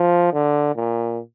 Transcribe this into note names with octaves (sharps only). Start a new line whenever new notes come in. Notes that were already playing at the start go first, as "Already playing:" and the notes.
Already playing: F3
D3
A#2